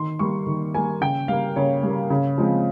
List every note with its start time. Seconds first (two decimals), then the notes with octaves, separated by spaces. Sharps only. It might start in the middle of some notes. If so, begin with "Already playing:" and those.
Already playing: D#3 C6
0.19 G3 A#3 C#6
0.47 D#3
0.74 G3 A#3 G#5
1.01 C#3 G5
1.28 G3 A#3 F5
1.56 C#3 C#5
1.83 G3 A#3
2.10 C#3
2.38 F3 G#3 C4